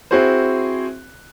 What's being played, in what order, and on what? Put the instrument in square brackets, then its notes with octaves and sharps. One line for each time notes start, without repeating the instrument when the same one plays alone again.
[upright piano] C4 E4 F#4 G#4 C5